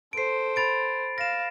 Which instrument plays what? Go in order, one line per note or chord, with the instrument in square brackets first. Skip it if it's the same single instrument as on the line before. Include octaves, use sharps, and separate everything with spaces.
[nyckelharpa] A4 C5 [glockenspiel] C7 D7
[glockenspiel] B5 A6 D7
[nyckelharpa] F5 [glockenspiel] A#6 E7